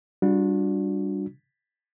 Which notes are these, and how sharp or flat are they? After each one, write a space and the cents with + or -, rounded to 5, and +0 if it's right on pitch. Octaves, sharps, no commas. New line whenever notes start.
G3 +0 D4 +0 F#4 -45